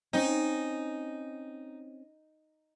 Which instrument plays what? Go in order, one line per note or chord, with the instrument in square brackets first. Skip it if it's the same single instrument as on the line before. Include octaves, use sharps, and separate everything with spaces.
[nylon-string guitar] C4 C#4 [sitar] D#4